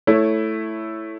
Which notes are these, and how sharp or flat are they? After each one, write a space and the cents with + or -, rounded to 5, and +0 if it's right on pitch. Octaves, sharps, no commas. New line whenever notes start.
A3 +0 E4 +0 C#5 +0